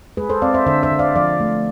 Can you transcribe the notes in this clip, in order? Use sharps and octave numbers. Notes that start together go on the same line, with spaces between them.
G#3 G#4 B4
A4 C5
C4 D5 F5
C5 E5
D3 C5 E5
C5 E5
D3
D5 F5
F3 D5 F5
A3